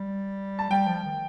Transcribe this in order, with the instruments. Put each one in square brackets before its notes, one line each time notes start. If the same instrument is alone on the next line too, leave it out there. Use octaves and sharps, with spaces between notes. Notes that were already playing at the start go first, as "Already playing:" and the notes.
Already playing: [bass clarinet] G3
[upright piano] A5
[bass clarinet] G3 [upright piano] G5
[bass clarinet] F3
D#3